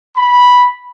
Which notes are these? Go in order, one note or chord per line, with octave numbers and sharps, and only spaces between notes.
B5